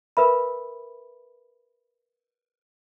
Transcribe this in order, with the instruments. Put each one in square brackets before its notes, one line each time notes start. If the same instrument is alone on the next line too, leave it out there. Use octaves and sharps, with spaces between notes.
[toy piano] A#4 B4 E5 B5